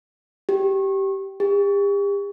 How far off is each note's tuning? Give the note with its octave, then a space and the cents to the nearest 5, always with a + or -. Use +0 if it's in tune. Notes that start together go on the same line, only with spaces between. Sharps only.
G4 -15
G4 +40